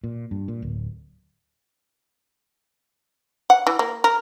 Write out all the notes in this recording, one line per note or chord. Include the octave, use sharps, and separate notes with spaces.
A#2
G2
A#2
D1
F#5
E3
A#3
A#4